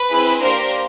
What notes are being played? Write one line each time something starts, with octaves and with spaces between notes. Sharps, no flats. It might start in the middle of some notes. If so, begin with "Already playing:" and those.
Already playing: B4
C4 E4 G#4
A#3 D4 G4 A#4 C5